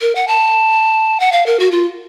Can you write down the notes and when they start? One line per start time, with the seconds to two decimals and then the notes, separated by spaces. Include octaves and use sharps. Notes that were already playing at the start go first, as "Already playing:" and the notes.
0.01 A#4
0.15 F#5
0.28 A5
1.20 F#5
1.32 F5
1.46 A#4
1.60 F#4
1.71 F4